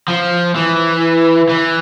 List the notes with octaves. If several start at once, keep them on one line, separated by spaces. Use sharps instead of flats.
F3
E3
E3